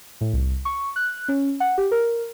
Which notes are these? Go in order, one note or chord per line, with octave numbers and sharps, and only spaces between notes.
A2
C2
C#6
F#6
C#4
F#5
G4
A#4